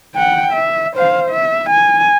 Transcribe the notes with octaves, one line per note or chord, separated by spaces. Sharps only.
F#5 G5
E5
C5 F5
E5
G#5